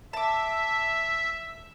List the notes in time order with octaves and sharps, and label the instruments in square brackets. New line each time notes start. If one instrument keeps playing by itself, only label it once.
[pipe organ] E5 [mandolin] A5 D6